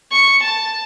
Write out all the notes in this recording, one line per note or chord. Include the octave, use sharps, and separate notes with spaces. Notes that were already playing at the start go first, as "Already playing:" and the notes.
C#6
A5